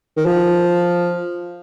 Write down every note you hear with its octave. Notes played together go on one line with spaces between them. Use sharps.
D#3
F3